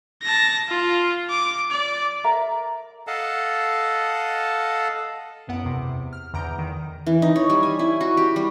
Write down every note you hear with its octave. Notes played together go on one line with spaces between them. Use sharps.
A5 A#6
F4
D6
D5
A4 A#4 E5 A#5
A4 D#5 F5 F#5 A5
A1 F#2 B3 F#5 D7
E2 C3
F6
E2 D3 A#5 G6 D7
D#3
E3
D#4
C#5
G3
G#5
E4
F#4
G4
G3